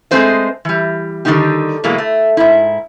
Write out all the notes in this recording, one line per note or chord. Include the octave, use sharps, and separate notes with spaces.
G#3 A3 C4 B4 C5 D#5
E3 G3
D3 D#3 G3 A#3 D#4 G4
B2 E3 F#3 G#3 A#3
A3
G#2 E4